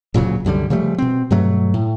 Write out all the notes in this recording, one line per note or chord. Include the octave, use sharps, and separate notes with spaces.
D1 A#2 C#3 F#3
C2 F#2 D3 G3
C#3 F3 G3 A3
B2 C4
G2 B2 F#3 A3
A2